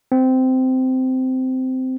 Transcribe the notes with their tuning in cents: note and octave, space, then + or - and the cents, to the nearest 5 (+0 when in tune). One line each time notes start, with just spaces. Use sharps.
C4 -15